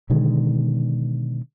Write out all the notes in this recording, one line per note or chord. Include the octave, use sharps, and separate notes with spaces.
B2 D3 D#3 G#3